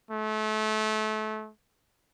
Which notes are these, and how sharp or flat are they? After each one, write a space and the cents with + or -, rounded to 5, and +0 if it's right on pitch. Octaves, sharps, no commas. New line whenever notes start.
A3 -30